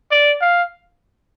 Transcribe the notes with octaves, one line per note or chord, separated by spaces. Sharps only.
D5
F5